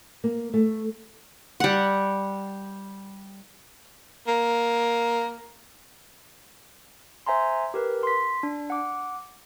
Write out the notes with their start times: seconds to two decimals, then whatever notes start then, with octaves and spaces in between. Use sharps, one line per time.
0.24 A#3
0.54 A3
1.60 G3 F#5
4.27 A#3
7.27 C5 E5 G#5 A#5 C6
7.74 G4 A#4 B4
8.03 C6 B6
8.43 D4
8.70 F#5 D6